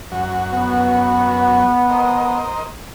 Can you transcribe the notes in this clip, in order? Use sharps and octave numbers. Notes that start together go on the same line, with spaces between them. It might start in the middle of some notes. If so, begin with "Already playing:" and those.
F#2 F#4
B3
A#4 C5 D#5